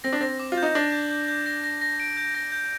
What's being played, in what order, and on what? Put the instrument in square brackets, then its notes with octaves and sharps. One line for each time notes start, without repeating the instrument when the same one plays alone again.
[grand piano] C4 [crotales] A#6
[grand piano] D4
[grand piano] C4 [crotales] A#6
[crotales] D6
[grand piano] F4
[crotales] G6
[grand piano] D#4
[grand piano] D4 [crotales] A#6
[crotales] G6
G6
G6
A#6
A#6
A#6
D7
G6
A#6
G6